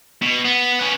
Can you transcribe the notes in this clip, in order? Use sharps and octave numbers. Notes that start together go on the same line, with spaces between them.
B2
B3
C#4 B4